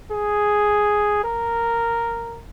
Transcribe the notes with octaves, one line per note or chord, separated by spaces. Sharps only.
G#4
A#4